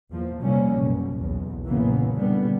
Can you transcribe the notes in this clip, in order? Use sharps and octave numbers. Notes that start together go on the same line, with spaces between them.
E2 F3 A#3
F2 C3 G3 A#3 C#4
F#1 B1 B2
B1 E2
F#1 A#2 C#3 E3 A#3 B3
B2 D3 G3 B3